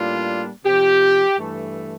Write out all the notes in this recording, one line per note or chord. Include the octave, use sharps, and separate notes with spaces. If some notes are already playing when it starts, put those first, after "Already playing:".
Already playing: A2 G3 A#3 D4 F4
C3 F3 C4 G4
G2 E3 A3